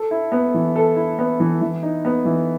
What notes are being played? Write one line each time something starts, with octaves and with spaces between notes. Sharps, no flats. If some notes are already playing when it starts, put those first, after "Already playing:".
Already playing: A4
E4
B3
E3
A4
E4
B3
E3
E3
D#4
B3
E3